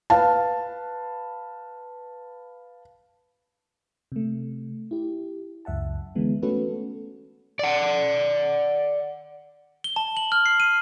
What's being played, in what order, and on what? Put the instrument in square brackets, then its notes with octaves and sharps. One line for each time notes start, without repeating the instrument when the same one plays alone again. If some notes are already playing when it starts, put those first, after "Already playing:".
[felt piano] B4 F5 A5
[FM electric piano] C3 A3
E4 G4
C#2 F#2 E5 F#5 A5
D3 E3 G#3 B3
A3 B3 C#4 F#4 A4 B4
[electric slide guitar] D5 F#5
[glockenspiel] G7
A5
F#7
F6
C7
D#7